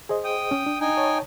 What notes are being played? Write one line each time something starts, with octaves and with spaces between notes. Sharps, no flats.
G#4 C5 D#5
G5 D#6
C#4
D4
D#4 G5 G#5
C#5 A5